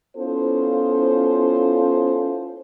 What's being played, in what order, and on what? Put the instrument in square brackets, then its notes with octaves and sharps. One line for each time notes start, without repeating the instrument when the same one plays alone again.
[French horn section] B3 C#4 E4 F4 A4 C5